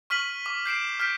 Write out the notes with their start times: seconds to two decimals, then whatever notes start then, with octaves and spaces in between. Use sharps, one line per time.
0.10 C#6 F6 B6 D#7 F#7
0.46 D6
0.65 G6 C7 D7 E7
1.00 F6 G6 B6 D7